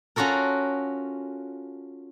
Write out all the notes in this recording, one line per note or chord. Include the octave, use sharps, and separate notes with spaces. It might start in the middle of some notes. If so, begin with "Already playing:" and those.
C#4 F4 F#4 A4 A#4